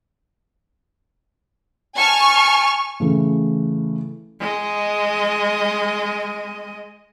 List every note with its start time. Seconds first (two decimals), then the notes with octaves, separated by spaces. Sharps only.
1.95 G#5 A5 C#6 F6
3.00 C#3 E3 A3
4.40 G#3 D#5